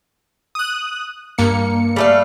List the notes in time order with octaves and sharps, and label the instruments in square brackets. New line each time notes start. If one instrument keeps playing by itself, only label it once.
[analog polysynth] D#6 F#6
G2 A#3 C#7
[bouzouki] G3 A3 F5